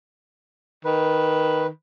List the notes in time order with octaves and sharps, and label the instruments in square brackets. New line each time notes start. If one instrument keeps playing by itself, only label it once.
[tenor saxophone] D#3 [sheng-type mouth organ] B4